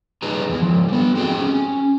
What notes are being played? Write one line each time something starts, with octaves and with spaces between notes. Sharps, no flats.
G2 D#4 G#4 B4 A#5
E2 E3
G#2 F3
G3 B3
C4 F#4 G#4 G5
C#4